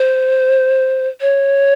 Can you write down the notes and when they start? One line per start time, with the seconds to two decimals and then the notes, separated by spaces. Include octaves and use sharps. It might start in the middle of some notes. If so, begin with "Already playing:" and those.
Already playing: C5
1.21 C#5